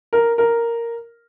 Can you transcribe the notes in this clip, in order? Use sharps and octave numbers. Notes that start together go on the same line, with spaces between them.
A#4
A#4